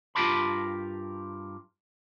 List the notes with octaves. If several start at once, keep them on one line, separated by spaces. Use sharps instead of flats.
G2 F4 G4 A#4 A5 B5